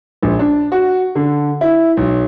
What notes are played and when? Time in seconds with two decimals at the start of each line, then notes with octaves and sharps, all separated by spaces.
0.23 A#1
0.39 D4
0.72 F#4
1.15 D3
1.61 E4
1.97 B1